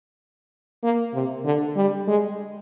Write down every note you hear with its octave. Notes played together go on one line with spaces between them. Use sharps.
A#3
C3
D3
G3
G#3